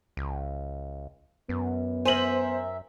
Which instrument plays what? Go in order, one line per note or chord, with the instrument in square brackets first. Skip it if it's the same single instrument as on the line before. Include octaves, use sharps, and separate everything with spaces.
[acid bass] C#2
[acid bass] F#2 [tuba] B3
[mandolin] A#4 E5 G#5 [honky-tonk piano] C5 F#7